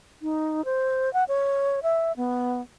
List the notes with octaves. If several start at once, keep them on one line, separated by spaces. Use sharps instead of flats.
D#4
C5
F#5
C#5
E5
B3